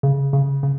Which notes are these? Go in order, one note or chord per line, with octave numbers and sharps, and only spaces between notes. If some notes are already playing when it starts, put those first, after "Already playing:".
C#3
C#3
C#3